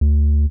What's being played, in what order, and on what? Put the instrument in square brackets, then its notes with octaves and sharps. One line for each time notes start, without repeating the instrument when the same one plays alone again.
[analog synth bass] D2